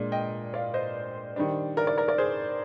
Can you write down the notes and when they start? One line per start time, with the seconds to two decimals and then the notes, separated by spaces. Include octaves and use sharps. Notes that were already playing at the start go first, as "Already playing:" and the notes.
Already playing: A#2 G#3 D4
0.12 D#5 G5
0.54 D5 F5
0.74 C5 D#5
1.36 D#3 G3 D4
1.77 A#4 D5
1.87 A#4 D5
1.98 A#4 D5
2.08 A#4 D5
2.18 G#4 C5